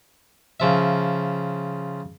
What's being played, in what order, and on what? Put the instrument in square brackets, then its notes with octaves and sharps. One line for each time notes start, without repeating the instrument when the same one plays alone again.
[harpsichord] C#3 F3 E5